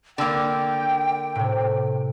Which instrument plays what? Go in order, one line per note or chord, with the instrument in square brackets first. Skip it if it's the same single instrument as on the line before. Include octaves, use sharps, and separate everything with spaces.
[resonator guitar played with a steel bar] D3 A#3 [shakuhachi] G5 [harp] D6 E6 F6
[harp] A2 C3